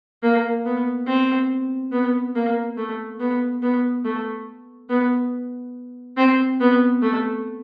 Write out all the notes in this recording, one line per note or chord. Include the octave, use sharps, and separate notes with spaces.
A#3
B3
C4
B3
A#3
A3
B3
B3
A3
B3
C4
B3
A3